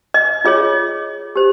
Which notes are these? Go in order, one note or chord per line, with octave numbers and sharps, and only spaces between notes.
D#5
F4 G#4 C#5 D#5
G4 C5